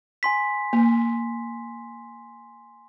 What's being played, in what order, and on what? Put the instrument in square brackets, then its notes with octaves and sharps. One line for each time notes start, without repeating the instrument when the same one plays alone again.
[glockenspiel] G#5 C6 B6
[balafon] A#3